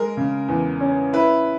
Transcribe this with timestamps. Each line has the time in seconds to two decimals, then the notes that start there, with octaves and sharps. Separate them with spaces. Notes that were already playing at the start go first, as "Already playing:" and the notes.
Already playing: G#3 A#4
0.17 C#3
0.48 E2
0.80 C#4
1.13 E4 B4